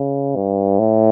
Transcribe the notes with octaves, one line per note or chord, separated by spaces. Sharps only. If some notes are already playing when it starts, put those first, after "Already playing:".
Already playing: C#3
G2
A2